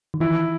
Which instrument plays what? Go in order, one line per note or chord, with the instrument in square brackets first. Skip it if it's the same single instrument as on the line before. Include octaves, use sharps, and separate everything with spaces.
[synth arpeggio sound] D#3
[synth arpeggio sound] E3 [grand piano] E4